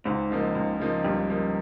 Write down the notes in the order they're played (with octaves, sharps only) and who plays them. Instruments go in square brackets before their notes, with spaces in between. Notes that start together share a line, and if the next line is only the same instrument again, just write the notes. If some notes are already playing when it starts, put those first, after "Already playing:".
[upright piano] C#2 [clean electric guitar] G#2
[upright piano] C#3 F3 A#3 D#4
C#2
C#3 F3 A#3 D#4
[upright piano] C#2 [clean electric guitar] G2
[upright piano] C#3 F3 A#3 D#4